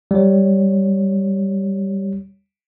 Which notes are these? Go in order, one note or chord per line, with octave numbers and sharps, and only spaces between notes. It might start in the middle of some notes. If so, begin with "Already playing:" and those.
G3 C#5